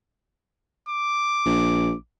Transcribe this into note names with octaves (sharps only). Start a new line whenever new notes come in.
D6
A#1